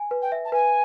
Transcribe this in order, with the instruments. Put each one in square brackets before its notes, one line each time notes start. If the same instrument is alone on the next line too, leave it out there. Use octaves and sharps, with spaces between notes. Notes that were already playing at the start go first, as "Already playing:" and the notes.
Already playing: [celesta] G#5
B4
[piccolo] G5
[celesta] E5
[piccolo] A5
[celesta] B4 [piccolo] G#5